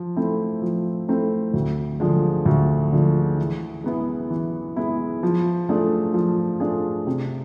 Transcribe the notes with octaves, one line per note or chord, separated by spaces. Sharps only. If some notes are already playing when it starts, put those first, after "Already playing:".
Already playing: F3
A3 C4 E4
F3
A3 C4 E4
D2
D3 F3 G#3
D2
D3 F3 G#3
E3
G#3 B3 E4
E3
G#3 B3 E4
F3
A3 D4 F4 G#4
F3
A3 D4 F4 G#4
C3